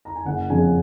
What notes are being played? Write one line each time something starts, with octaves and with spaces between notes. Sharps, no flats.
A#5
G#5
F#1 F#5
F2 C#3 F3 G#5